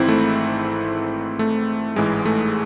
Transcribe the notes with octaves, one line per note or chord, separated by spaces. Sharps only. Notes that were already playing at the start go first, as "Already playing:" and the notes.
Already playing: G#1 G#2 E3 C4 E4
A3
A3
A1 G#2 E3 G#3
A3